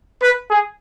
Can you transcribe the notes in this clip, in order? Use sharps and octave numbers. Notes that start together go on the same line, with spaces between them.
B4
G#4